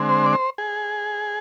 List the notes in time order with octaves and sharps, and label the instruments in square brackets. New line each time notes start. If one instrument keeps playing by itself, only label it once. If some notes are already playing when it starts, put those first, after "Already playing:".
Already playing: [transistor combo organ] D3 G#3 C4
C5
D5
C5
G#4